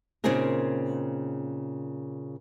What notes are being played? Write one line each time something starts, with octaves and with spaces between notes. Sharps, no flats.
A#2 C#3 C4 D#4 G#4 A#4